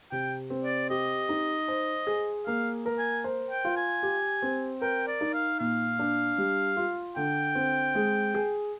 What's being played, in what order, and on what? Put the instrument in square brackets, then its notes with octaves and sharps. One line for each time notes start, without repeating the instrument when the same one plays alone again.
[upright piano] C3 [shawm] G5
[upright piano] C4
[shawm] D5
[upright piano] G4 [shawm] D#5
[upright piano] D#4
C5
G#4
[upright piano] A#3 [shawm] F5
[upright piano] A#4
[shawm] G#5
[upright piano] C5
[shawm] G5
[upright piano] F4
[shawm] G#5
[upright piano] G4
C4
[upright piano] A#4 [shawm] G5
[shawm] D5
[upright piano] D#4
[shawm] F5
[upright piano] A#2 [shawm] F5
[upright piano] D4
G3
F4
[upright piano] D3 [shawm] G5
[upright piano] C4
G#3
G#4